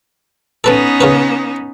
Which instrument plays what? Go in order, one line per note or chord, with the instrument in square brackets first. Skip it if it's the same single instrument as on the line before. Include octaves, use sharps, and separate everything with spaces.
[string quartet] B3 C#4 D#4 [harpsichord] A4 B4 A5
[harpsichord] C#3 A#4 B4